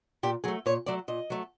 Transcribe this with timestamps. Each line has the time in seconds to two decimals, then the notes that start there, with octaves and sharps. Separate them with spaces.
0.23 A#2 G4
0.44 F#3 A3 G#4
0.66 A#2 C#5
0.86 F#3 A3 D5
1.08 A#2 D#5
1.30 F#3 A3